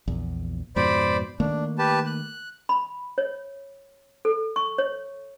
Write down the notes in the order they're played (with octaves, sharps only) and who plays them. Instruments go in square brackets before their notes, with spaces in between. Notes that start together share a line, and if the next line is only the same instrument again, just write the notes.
[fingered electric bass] A#1 E2
[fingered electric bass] F2 G#2 B2 [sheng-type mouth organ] C5 D5 B5
[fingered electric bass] D#3 A3 A#3 [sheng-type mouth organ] D4
[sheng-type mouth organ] G4 B4 A5
F#6
[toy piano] B5
C#5
A4
C#6
C#5